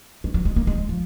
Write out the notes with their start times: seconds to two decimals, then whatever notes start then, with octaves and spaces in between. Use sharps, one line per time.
0.24 G#3
0.34 F#3
0.45 G#3
0.56 A#3
0.67 G#3
0.78 G#3
0.89 F3